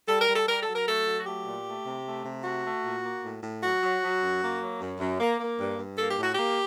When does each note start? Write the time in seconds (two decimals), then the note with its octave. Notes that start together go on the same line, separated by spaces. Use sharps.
0.08 G3 A4
0.21 A#4
0.28 G3
0.35 A4
0.47 G3 A#4
0.62 F#3 A4
0.75 A#4
0.87 A3 A4
1.06 F#3
1.16 F#4
1.26 A3 G4
1.45 A#2
1.66 A3
1.85 C3
2.05 A3
2.24 C3
2.44 A3 F#4
2.64 A3
2.84 A#2
3.03 A#3
3.23 A2
3.43 A2
3.63 F#3 F#4
3.83 F#3
4.02 F#3
4.21 F#2
4.41 A#3
4.61 F#3
4.81 F#2
5.00 F#2
5.20 A#3
5.40 A#3
5.58 G2
5.78 G2
5.98 A#3 A4
6.11 G4
6.18 A2 F#4
6.34 A#3 G4